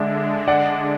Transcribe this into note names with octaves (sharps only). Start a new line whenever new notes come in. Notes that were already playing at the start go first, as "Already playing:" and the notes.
Already playing: D3 G#3 D4 E5
D5 F#5